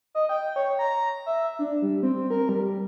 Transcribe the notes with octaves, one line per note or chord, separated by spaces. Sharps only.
D#5
G5
C#5
A#5
E5
D4
G3
C4
A#4
G3